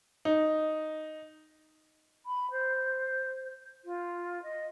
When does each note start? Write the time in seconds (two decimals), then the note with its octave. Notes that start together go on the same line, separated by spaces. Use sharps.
0.25 D#4
2.25 B5
2.51 C5
3.84 F4
4.42 D#5